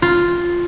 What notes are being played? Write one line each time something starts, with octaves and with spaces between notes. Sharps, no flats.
F4